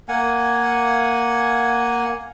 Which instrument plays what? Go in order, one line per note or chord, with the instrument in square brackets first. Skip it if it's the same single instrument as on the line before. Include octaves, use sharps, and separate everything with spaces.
[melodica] A#3 F#5 G#5